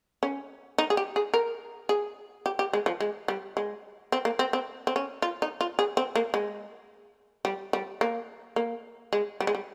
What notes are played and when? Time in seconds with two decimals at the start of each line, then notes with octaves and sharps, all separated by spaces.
0.23 C#4
0.78 D#4
0.90 G#4
0.97 G4
1.16 G#4
1.34 A#4
1.89 G#4
2.46 G4
2.59 G4
2.73 G#3
2.86 F3
3.00 G#3
3.28 G3
3.57 G#3
4.12 C4
4.25 A#3
4.39 C4
4.53 C4
4.87 C4
4.96 C#4
5.22 F4
5.42 D#4
5.61 F4
5.79 G#4
5.97 C4
6.16 A#3
6.34 G#3
7.45 G3
7.73 G3
8.01 A#3
8.56 A#3
9.13 G#3
9.40 G3
9.47 G#3
9.55 G3